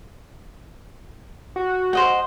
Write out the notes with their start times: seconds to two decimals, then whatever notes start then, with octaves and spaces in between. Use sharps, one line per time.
1.56 F#4
1.93 C5 D#5 F#5